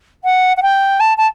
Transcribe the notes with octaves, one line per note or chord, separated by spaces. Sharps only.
F#5
F#5
G5
A5
A5